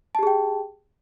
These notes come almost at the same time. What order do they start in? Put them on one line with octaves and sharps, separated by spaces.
A5 G4 G#4 G5